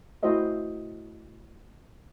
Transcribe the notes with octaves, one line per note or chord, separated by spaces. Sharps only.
A3 E4 F#4 C5 D#5 E5